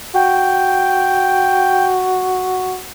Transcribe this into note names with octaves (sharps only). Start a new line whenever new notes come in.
F#4 G5